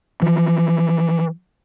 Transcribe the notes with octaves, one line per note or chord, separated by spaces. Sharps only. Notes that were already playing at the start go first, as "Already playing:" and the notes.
E3 F3